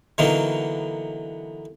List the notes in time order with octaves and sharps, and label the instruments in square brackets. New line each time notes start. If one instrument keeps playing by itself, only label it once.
[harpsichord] D3 E3 F#3 A#3 B3 D#4